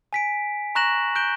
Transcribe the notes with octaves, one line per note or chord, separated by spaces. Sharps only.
G#5 B6 D7
A#5 C#6 F#6 A#6 E7 F#7
F#6 G6 D7 E7 G7